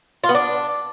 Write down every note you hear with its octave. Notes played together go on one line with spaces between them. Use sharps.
F4
B3
D4